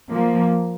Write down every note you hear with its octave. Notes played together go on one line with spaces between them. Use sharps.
F3 A#3